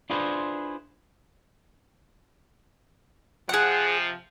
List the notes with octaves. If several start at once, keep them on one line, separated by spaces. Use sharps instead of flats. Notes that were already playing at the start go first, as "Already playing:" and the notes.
D4 E4 F4 G#4 B4 C5
C3 F3 G#4 F#5